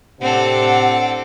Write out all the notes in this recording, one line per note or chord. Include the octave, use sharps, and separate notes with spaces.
A2 C3 C4 D4 A4 F#5